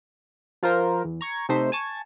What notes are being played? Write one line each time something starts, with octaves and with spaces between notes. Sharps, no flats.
F3 F4 A#4 C5
E2
A#5 C#6 G#6
C3 A3 D#4 C5 E5
G#5 A5 C#6